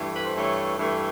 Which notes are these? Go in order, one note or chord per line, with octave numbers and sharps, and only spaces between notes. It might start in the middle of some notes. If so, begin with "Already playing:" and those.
Already playing: G2 E3 A3
B4
C5
G2 E3 A3 C#5
G2 E3 A3